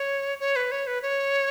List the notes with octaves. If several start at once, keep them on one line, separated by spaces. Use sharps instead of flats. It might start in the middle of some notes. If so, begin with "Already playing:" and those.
Already playing: C#5
C#5
B4
C#5
B4
C#5